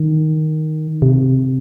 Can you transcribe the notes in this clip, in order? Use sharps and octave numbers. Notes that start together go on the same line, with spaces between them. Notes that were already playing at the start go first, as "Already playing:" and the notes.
Already playing: D#3
C3